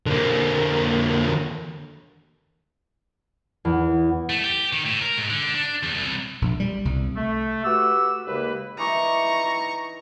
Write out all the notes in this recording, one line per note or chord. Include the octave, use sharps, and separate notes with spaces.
D3 A#3
E2
A3
G4
D#3
A2
A#4
G#2
D3
D4
E2
C2
A#1
G3
C2
A3
F#4 G4 B4 E6
D#2 C#3 G#3 A#3 B4
E3 D#4 A#5 C#6 D6